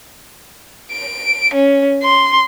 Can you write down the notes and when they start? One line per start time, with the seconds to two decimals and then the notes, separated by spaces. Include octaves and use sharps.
0.92 D7
1.54 C#4
2.03 C6